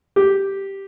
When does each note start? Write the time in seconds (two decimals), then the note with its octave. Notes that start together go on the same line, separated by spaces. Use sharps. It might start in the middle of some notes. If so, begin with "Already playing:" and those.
0.16 G4